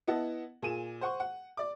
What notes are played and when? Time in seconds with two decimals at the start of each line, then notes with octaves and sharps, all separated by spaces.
0.07 B3 E4 D#5 F#5 A5
0.62 A#2 G#4 D#7 E7
1.01 C5 F#5 C#6
1.20 F#5
1.57 D5 D6